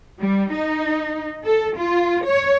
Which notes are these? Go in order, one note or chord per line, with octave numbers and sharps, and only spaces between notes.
G3
D#4
A4
F4
C#5